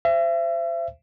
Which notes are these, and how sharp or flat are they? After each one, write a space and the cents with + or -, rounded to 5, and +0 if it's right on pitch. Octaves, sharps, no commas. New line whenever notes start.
C5 +0 E5 +35